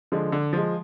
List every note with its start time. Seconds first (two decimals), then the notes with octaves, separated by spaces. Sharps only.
0.12 D3 F3 G#3
0.32 D3
0.53 F3 G#3